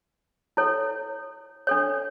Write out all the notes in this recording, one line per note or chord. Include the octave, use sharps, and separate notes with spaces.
E4 A4 C#5
D4 A4 C#5